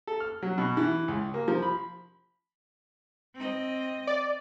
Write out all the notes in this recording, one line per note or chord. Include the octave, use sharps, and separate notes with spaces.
A4
F6
F#3
B2
E3
C#2
A#3
F3
B5
C4 D#5
D5